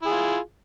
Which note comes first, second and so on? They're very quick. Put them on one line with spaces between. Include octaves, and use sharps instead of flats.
E4 G#4 F4